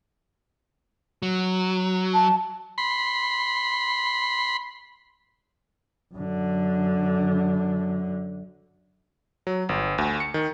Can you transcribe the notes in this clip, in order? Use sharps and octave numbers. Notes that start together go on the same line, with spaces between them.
F#3
A5
B5 C6
F#2 D3
F#3
G1
D2
C#7
D#3